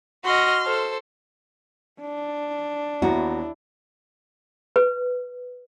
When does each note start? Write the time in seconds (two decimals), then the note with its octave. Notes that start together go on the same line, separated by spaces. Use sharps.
0.24 F#4 D#5 C6 F6
0.65 A4 C5
2.01 D4
3.02 D#2 B3 E4 F#4 A#5
4.76 B4